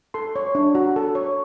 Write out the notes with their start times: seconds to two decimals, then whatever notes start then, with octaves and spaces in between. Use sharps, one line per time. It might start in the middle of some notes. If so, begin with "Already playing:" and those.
0.14 A4 C6
0.36 C#5
0.55 D4
0.75 F#4
0.96 A4
1.15 C#5